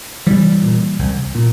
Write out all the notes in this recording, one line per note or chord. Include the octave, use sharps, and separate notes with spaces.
C2 E3 G3
A#2
C2
A#2